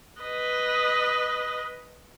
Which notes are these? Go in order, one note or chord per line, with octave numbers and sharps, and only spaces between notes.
B4 D#5